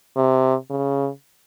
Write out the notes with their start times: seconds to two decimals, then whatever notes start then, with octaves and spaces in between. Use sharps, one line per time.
0.16 C3
0.70 C#3